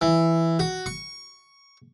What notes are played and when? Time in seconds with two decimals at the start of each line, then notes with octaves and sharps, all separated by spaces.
0.01 E3
0.59 F#4
0.86 C#6